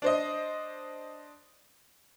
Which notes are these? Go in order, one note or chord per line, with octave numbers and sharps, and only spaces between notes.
D4 C5 D#5